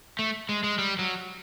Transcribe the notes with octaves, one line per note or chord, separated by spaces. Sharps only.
A3
G#3
G#3
G3
F#3